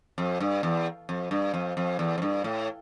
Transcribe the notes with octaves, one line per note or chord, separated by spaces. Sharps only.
F2
G2
E2
F2
G2
F2
F2
E2
F2
G2
A2